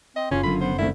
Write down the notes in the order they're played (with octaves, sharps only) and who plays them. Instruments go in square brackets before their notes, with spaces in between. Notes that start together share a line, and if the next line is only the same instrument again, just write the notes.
[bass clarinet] C4 [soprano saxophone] D#5
[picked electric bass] F#1 C#3 [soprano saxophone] C#4 [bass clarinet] F4
[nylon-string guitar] F#2 D3 [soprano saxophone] B5
[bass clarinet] B3 [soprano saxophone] C5
[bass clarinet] C2 [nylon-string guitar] D#3 A3 C4 [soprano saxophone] E4